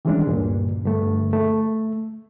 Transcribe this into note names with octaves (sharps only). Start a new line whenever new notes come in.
D#3 E3 G3 G#3 C#4 D4
D2 G2 A#2
G2 D3 A3
A3